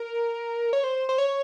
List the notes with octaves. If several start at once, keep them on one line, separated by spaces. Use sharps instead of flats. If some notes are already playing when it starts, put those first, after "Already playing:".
Already playing: A#4
C#5
C5
C5
C#5